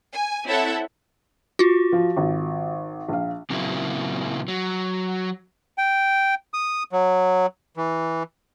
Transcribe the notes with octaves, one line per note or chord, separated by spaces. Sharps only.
G#5
C4 E4 A4 C#5 E5 F#5
F4 F#4
F3
G#1
A#1 F5
A#2 C#3 F#3 A#3 C4 E4
F#3
G5
D#6
F#3
E3